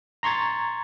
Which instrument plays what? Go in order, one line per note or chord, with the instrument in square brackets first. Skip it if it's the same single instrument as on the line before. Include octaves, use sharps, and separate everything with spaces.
[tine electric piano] A#5 C6 C#6 G#6 A6